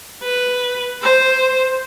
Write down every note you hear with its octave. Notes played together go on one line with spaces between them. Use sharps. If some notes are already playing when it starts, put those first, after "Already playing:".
B4
C5